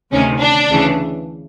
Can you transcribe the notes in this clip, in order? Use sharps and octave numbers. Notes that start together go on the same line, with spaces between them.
D2 C3 D#3 C#4
D4
D2 C#3 E3